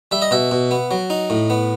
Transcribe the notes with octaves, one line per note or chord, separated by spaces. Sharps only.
G3 E5
D#5
B2 E5
B2
B3
F#3
D#4
A2
B3